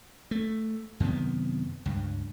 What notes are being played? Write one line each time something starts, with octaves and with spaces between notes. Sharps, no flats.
A3
F#2 C3 D#3 B3
C#2 G2